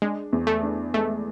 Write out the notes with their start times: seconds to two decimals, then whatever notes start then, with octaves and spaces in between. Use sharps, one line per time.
0.02 G#3 D4
0.33 E2
0.47 A3
0.63 D4
0.94 G#3 A3